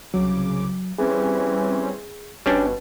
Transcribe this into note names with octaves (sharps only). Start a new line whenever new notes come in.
C2 C#3 F#3 D6
E3 G3 C4 C#4 G#4
G1 B2 G3 C#4 D4